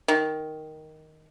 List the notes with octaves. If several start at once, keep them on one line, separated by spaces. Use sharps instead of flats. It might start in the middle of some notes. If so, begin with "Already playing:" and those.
D#3